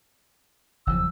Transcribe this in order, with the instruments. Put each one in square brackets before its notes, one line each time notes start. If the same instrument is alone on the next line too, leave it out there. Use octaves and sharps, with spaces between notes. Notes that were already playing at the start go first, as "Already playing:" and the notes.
[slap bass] F#1 E2 F3 [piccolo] E6